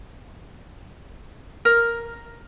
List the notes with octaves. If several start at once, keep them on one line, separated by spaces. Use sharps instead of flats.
A#4